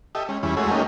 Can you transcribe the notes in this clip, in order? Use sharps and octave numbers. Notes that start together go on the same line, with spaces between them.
G4 A4 D#5 E5
G#3 C#4
E2 G3 C#4 E4 G#4
G#3 A3 F#4 G#4 C#5 E5
F#3 A3 A#3 C#4 D#4 G4